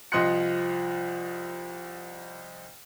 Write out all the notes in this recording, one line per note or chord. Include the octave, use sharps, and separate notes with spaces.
C2 F3 D#5 C6 F#6 C#7